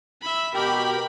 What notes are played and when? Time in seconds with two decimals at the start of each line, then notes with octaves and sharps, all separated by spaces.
0.22 E5 B5
0.54 B2 G4 A#4 B5